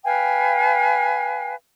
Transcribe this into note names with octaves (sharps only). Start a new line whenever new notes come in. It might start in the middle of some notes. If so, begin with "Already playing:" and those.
B4 F5 G5 G#5